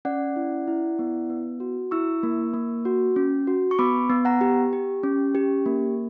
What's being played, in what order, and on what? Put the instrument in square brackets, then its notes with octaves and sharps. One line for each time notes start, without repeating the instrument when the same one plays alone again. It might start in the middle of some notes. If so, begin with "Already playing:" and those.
[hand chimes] C#4 D5 F#5
E4
E4
B3
B3
F#4
E4 C#6 E6
A#3
A#3
F#4
C#4
F#4
C#6
B3 B5 D6
B3
F#5 A#5
G4
G4
C#4
G4
A#3